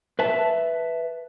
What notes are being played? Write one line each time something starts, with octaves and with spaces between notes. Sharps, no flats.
B4 E5 A5